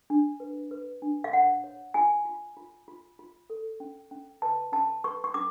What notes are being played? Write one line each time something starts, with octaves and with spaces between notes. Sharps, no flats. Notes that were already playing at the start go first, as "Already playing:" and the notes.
D4
B4
B4
D4
F5
C#5 F#5
C#5
F4 G#5
F4
F4
F4
F4
A4
C#4
C#4
B4 A5
C#4 A5
B4 C#6
C#6
C#4 D6